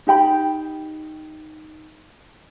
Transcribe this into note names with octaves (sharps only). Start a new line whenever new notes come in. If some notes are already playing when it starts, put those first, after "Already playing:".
D#4 G4 G5 B5